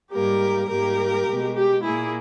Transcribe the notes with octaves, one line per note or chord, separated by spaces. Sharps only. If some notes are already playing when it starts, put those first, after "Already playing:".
G#2 G3 A#3 G4 A#4
G#2 G3 A#3 G4 A#4
B2 G#3
G4
A#2 A#3 E4 G#4